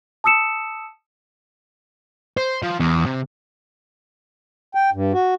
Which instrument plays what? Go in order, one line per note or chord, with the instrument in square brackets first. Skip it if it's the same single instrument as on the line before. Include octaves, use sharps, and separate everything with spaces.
[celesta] A5 D#6 E6 C#7 E7
[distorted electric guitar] C5
F3
E2
C3
[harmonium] G5
G2
F#4